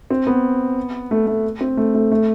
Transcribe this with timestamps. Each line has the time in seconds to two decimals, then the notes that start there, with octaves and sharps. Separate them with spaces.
0.10 C4
0.27 B3
1.11 A3
1.27 A3
1.61 C4
1.77 A3
1.95 A3
2.11 A3